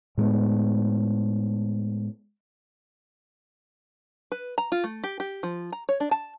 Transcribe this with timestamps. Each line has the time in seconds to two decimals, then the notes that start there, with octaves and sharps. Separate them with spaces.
0.17 A2 G#3 A3 B3
4.32 B4
4.58 A#5
4.72 F4
4.84 A3
5.04 G4
5.20 G4
5.43 F3
5.72 A#5
5.89 C#5
6.00 D4
6.11 A5